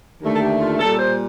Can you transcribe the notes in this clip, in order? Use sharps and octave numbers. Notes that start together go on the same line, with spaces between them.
D#2 D3 A3
A4
G4
F4
A#2 G3 A4
C5